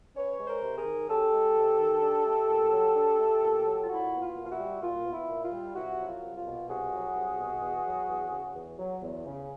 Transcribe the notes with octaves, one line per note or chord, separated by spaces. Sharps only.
C#4 B4 C#5
G#3
A#4 C5
C3
G#4 A#4
D#3
C#4 G4 A4
G#3
C3
D#3
D4
A3
A#2
F#3
D4
A3
A#2
F#3
F4
A#2 E4 F#4
B3
F4
A#2
F4
E4 F#4
G3
A#2 F4
B3
E4
A#2
F4
G3
C2 E4 F#4
F#3
F4
C2
F4
B2
C2 F#4 G#4
F#3
C2
B2
E2
F#3
E2
C#3
E2
F#3
E2
C#3